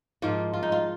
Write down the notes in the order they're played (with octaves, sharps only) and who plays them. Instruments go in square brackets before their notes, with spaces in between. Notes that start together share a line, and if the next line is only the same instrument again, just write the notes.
[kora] G#2 F3 A#3 F4
F4
D#4
F4